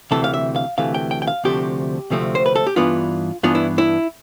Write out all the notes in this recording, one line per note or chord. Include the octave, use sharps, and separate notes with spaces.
D2 C3 E3 A3 A4
F5
E5
F5
D2 C3 E3 A3 F5
G5
G5
G5
F5
D2 C3 F3 A3 C4 G4
D2 C3 F3 A3 C4
C5
B4
A4
G4
G2 E3 B3 D4 F4
G2 E3 B3 D4 F4
E4
E4